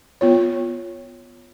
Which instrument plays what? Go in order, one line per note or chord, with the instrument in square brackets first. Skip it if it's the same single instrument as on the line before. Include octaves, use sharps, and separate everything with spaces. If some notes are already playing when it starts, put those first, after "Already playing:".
[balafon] B3 F4 C#5